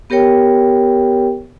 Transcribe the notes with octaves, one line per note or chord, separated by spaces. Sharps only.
B3 G4 A#4 C#5 G5